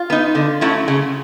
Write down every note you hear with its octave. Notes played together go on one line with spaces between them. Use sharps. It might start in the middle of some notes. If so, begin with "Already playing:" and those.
Already playing: F4
B3 D#4
D3
F#3 A3 C#4 E4
C#3